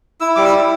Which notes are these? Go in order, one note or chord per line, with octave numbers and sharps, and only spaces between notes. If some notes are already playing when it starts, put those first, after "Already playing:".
E4 E6
G3 D6
E6
E4